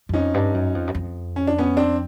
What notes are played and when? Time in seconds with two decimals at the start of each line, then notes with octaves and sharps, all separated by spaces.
0.09 F#2
0.13 F2 C#4 D#4
0.34 G2
0.54 F#2
0.75 F2
0.87 F#2
0.95 F2
1.36 C#4
1.47 D4
1.58 B3 C#4
1.77 C4 D4